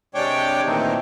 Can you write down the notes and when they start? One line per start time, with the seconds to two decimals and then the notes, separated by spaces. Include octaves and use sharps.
0.15 C3 G#3 D4 C#5 G5 D6
0.66 A#2 D#3 E3 A3 C4 D#4